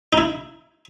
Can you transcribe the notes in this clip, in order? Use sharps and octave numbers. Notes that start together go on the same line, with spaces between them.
D#4
E4